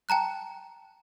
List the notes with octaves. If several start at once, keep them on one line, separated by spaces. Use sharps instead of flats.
G5 A5 A#5 F#6